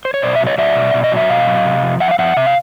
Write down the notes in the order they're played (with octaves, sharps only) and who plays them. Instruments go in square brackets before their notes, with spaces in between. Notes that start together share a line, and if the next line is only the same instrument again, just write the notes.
[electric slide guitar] C5
C#5
B2 C5 D5
E5
F#3
C#5 D#5
F#3 D5 E5
B2
B2
D#5
F#3 E5
B2 D#5 F5
F#3
C3
F3
F3 E5 F#5
F5
F3 E5 F#5
C3 E5
F5